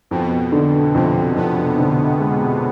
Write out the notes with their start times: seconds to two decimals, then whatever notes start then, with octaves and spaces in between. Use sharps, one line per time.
0.11 F2 B2
0.52 D3
0.94 F2 C3
1.36 F2 B3
1.78 D3
2.19 G#3